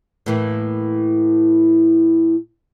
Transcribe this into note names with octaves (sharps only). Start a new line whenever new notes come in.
A2 E3 A#3